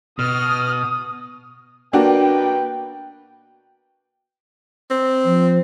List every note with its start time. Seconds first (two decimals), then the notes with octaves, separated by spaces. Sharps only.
0.19 B2 D#6 F6
1.93 B2 A#3 D4 F#4 B4 G5
4.90 C4
5.25 F3